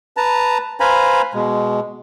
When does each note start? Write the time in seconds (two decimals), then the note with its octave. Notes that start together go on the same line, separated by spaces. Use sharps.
0.17 B4 A5 A#5
0.80 B4 C5 F5 G#5 A#5 B5
1.34 B2 G#3